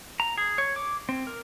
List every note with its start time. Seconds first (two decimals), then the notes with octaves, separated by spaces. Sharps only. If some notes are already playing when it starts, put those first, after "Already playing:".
0.20 A#5
0.38 G#4
0.58 C#5
0.76 D6
1.09 C4
1.27 A#4